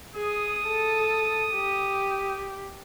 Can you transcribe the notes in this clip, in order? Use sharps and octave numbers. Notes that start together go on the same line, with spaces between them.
G#4 D#6
A4
G4